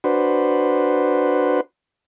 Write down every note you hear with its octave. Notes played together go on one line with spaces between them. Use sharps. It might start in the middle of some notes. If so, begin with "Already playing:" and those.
D4 F#4 B4 C5